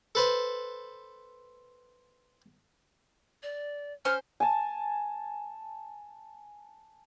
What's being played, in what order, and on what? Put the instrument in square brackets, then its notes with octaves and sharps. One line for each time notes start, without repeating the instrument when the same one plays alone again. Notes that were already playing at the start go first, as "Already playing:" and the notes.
[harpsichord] A4 B4 C5
[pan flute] D5
[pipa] C#4 C5 [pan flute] F6
[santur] G#5 A5